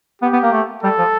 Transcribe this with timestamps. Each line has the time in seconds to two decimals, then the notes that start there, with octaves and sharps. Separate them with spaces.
0.22 B3 G4
0.33 B3
0.43 A#3
0.52 A3
0.83 G3 A4
0.98 F3